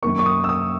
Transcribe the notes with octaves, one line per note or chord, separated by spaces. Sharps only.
F#2 D#3 A#3 C#6
C#6
D#6
E6
D#6